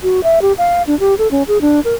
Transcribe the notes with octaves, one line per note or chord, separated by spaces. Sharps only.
F#4
E5
G4
F5
D4
G4
A4
C#4
G#4
D4
A#4